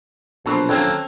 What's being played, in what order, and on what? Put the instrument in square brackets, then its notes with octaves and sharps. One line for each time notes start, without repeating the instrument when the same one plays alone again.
[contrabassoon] A#1 [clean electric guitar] B2 F#3 [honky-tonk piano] A4 C5
[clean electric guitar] D#2 F#3 A#3 [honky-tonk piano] C4 C#4 [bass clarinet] A4